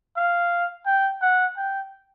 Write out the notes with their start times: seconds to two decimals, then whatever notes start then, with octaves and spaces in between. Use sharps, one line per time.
0.17 F5
0.86 G5
1.22 F#5
1.57 G5